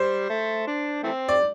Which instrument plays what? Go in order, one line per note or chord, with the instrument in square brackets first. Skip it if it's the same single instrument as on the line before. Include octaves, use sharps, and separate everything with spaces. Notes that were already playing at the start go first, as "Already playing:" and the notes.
Already playing: [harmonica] G3 [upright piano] C5
[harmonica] A3
D4
E3 A3 C4
[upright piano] D5